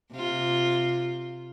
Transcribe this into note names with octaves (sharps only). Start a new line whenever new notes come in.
C3 F4